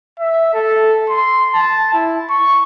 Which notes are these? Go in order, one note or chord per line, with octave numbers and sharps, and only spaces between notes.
E5
A4
C6
A5
E4
C#6